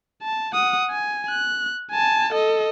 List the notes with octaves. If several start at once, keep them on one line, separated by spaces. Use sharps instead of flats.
A5
F#5 D#6
G#5
F#6
G#5 A5
A4 D#5